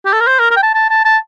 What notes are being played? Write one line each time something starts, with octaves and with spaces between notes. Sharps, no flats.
G4
A4
A#4
C5
A#4
A#4
G5
A5
A5
A5
A5